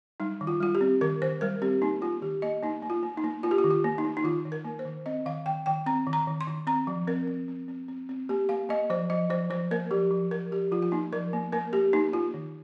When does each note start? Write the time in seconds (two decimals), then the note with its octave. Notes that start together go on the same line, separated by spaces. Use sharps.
0.20 G3 D#4
0.41 D#3
0.47 F4
0.60 G3 F4
0.75 G4
0.81 C4
1.01 D#3 A#4
1.22 D#3 C5
1.41 G3 A#4
1.62 C4 G4
1.82 A#3 D#4
2.02 A#3 F4
2.22 D#3 G4
2.42 A#3 D#5
2.63 A#3 D#4
2.82 A#3
2.90 F4
3.03 A#3
3.17 D#4
3.24 A#3
3.43 A#3 F4
3.51 G4
3.58 F4
3.64 D#3
3.71 F4
3.84 A#3
3.98 D#4
4.05 A#3
4.17 D#4
4.24 D#3 F4
4.45 D#3
4.52 A#4
4.65 A#3
4.79 C5
4.85 D#3
5.06 C4 D#5
5.26 D#3 F5
5.45 D#3 G5
5.66 D#3 G5
5.86 C4 A#5
6.07 D#3
6.13 A#5
6.27 D#3
6.41 C6
6.47 D#3
6.67 C4 A#5
6.87 F3
7.07 C4 A#4
7.27 C4
7.48 C4
7.68 C4
7.88 C4
8.09 C4
8.29 A#3 G4
8.49 A#3 F5
8.69 A#3 D#5
8.90 F3 C5
9.10 F3 D#5
9.30 F3 C5
9.50 F3 C5
9.71 A#3 A#4
9.91 F3 G4
10.11 F3
10.31 F3 A#4
10.52 F3 G4
10.71 F3 F4
10.82 F4
10.92 A#3 D#4
11.12 F3 A#4
11.33 A#3
11.52 A#3 A#4
11.73 A#3 G4
11.93 A#3 D#4
12.13 A#3 F4
12.34 D#3